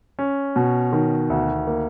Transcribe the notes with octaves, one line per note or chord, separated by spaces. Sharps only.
C#4
B2
D#3
D2
A#3